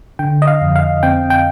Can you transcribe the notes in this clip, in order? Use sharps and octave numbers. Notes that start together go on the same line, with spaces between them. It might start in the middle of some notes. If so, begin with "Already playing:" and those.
D3 G5
D#5
F5
F2
F5
C4 G5
G5